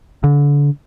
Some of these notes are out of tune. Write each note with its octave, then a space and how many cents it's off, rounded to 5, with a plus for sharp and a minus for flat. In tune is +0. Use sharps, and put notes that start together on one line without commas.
D3 -30